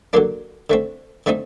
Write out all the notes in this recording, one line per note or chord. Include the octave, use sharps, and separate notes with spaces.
D3 F#3 A#3 D4
D3 A3 C4
D3 A3 C4 D#4